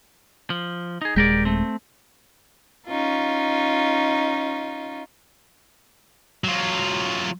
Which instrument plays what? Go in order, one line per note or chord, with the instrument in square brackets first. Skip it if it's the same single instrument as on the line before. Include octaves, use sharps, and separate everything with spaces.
[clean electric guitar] F3
D#4 G#4
[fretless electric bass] D#1 G#3 [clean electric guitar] G4 A#4 D5
[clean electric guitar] A3 C4
[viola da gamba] C#4 D#4 F4
[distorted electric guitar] F#3 F4